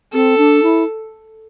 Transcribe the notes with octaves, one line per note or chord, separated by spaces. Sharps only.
C4 A4
D4
E4